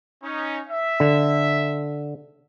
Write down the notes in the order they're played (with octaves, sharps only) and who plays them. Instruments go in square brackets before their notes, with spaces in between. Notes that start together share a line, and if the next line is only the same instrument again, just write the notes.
[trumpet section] C#4 D#4
E5
[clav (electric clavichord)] D3